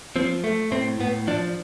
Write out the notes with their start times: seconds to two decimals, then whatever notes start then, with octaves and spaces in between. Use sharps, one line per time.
0.16 F3 C4
0.44 A3
0.72 A2 C4
1.00 A2 B3
1.27 F3 D4